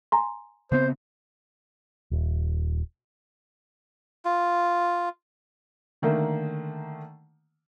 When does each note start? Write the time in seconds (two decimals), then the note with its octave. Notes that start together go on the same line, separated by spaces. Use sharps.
0.12 G#5 A#5 C6
0.72 C#3 B3 C4 C5
2.11 D#1
4.25 F4
6.02 D3 D#3 A3 A#3